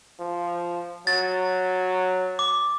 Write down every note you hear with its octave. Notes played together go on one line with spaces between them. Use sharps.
F3
F#3 A6
D6